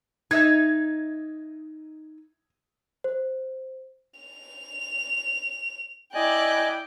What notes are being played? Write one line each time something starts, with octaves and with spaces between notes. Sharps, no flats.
D#4 E5 G#6
C5
F7
E4 D5 D#5 G5 G#5 F#6